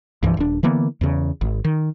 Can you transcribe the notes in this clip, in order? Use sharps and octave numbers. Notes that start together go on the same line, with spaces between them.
C2 G2 E3 F3
D#1 D4
D3 E3 A#3 B3
E2 C#3
G#1
D#3